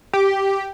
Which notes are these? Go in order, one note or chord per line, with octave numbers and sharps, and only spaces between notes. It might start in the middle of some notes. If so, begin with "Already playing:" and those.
G4